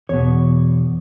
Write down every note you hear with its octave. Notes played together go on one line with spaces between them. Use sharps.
E2 B2 C#5